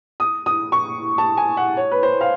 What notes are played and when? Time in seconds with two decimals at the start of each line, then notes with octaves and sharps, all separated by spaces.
0.20 D#6
0.46 D#6
0.72 C#6
1.18 A5
1.37 G#5
1.57 F#5
1.77 C#5
1.91 B4
2.03 C5
2.21 F5